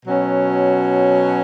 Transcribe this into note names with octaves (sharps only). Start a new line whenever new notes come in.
B2 F#3 C#4